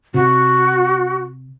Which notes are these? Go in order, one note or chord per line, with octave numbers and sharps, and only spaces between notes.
C3 F#4